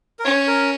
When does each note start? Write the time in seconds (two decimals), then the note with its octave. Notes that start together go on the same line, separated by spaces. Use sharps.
0.19 A#4
0.24 C#4 C#5
0.47 A#4